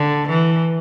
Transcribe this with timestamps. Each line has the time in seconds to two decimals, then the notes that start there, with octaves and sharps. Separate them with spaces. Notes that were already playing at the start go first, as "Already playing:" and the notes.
Already playing: D3
0.28 E3